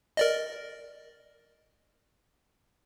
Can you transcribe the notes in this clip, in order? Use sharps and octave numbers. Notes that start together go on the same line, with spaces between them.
A#4 D5 D#5